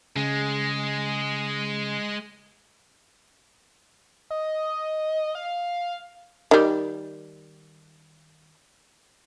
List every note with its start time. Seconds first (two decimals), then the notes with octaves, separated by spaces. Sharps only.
0.16 C#3 G#3
4.31 D#5
5.35 F5
6.51 D#3 G3